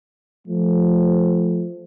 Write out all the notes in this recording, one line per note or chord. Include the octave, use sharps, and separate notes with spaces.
F3 A3